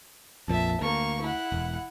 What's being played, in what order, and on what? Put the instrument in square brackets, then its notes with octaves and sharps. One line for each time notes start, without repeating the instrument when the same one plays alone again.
[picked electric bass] A#1 F2 A#2 [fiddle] E5 A5
[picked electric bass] D2 [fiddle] A#3 C#6
[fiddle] E4 F#5
[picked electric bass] E1